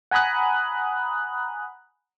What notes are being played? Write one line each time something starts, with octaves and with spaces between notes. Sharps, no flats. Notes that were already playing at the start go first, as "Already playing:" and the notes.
F#5 G#5 A#5 B5 D#6 F#6